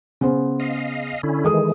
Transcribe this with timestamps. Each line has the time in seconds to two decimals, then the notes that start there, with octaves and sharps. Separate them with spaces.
0.21 C#3 B3 C5
0.60 D#5 F5
1.23 D3 C#4 E4
1.45 D#3 E3 G#3 G#4 A4 D#6